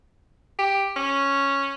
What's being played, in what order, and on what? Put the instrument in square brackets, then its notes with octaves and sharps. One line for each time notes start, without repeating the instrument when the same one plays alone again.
[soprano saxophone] G4
C#4